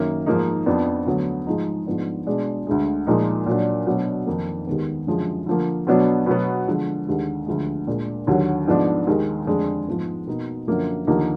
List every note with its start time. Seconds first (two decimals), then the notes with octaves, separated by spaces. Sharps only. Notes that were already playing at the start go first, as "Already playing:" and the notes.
Already playing: F#2 D#3 A#3
0.26 G#2 F3 A#3 D#4
0.66 F2 F3 B3 D4
1.06 D2 D3 F#3 B3
1.46 G#2 F3 G#3 D#4
1.87 G#2 F3 B3 D4
2.27 B2 G#3 D4
2.67 D2 D3 G#3
3.07 A#2 F3 G#3 D#4
3.46 A#2 F#3 D4
3.87 B2 F#3 D4
4.27 F2 D#3 A#3 D#4
4.67 D#2 D#3 G#3 B3
5.07 F#2 D3 F3 G#3
5.46 D3 F3 A#3
5.87 B2 F#3 B3 D4
6.26 B2 F#3 B3
6.67 D3 F3 G#3
7.07 D#2 D3 G#3
7.46 D2 D3 F3 G#3
7.87 A#2 G#3 D4
8.27 D#2 D3 F#3
8.67 G#2 F3 B3 D4
9.07 D#2 D#3 G#3
9.47 F2 D3 G#3 D4
9.88 G#2 F3 G#3 B3
10.27 B2 A#3 D#4
10.67 F#2 D3 F3 A#3
11.07 D#2 D3 F3 A#3 D#4